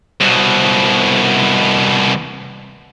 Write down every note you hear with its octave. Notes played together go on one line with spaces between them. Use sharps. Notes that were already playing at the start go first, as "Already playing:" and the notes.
C2 B2